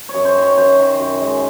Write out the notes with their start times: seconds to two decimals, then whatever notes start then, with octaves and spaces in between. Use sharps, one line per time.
0.09 C#5
0.14 F#2
0.25 C5
0.36 D#3
0.42 C#5
0.57 F#2 C5
0.79 D#3
0.99 F#2
1.21 G#3